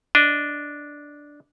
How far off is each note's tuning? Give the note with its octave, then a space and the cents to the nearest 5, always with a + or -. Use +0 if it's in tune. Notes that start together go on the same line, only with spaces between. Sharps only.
D4 -5 D#5 +0